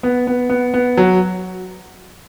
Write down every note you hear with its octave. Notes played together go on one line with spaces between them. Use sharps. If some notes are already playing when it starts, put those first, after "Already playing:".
B3
B3
B3
B3
F#3